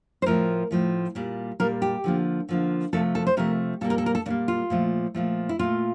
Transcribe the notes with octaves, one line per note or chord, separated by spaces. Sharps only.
C5
A2 F3 A3 A#4
A2 F3 A3
A#2 G3 A#3
A#2 G3 A#3 A#4
G4
D3 F3 A#3
D3 F3 A#3
C3 F3 A3 A4
A4
C5
C3 F3 A3 A#4
A#2 G3 A#3 A4
A#4
A4
A#4
A4
A#2 G3 A#3 D4
F4
A#2 F3 A3
A#2 F3 A3
E4
A#2 A3 F4